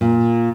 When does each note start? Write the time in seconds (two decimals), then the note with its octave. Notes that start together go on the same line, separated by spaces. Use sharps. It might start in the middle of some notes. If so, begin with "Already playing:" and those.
0.01 A#2